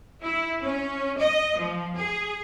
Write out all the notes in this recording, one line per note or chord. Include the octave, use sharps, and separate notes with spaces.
E4
C#4
D#5
F3
G#4